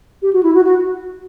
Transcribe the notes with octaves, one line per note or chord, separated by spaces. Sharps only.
G4
F#4
E4
F#4
F#4